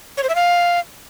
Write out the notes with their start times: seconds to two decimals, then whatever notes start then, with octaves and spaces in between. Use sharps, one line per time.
0.17 C#5
0.23 C5
0.29 E5
0.35 F5